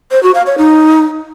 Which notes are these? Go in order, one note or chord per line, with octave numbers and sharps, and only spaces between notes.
C5
F#4
F5
C#5
D#4